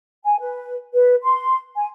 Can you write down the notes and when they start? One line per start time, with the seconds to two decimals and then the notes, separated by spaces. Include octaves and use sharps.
0.24 G#5
0.40 B4
0.94 B4
1.23 C6
1.76 G#5